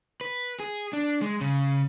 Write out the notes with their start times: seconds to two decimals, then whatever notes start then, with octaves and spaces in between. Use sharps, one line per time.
0.21 B4
0.60 G#4
0.93 D4
1.22 G#3
1.41 C#3